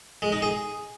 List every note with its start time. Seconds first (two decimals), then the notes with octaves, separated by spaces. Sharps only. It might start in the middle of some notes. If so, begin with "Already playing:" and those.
0.22 G#3
0.32 D#4
0.42 G#4